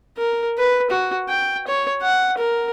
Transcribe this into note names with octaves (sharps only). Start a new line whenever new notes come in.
A#4
B4
F#4
G5
C#5
F#5
A#4